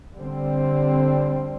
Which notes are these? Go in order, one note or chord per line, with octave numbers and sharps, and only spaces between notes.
D3 G3 C4